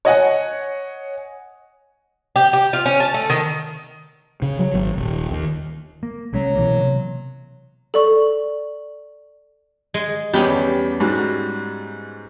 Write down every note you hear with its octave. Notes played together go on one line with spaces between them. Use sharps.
C#5 D#5 F#5 G#5
G4
G4
F4
C#4
A5
A3
D#3
C#3
F#3
G#1
D#1
D#2
A#3
C2 F#3 G#3 C#4
B2 E3 A#3
C3
A4 D5 C#6
G#3
E2 G3 B3 C#4 G4
G#2 G3 F#4